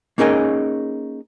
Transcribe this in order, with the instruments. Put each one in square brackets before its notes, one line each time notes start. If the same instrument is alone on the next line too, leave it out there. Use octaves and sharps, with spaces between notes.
[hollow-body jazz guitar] A#3 C#4 D#4 G#4 A#4 D#5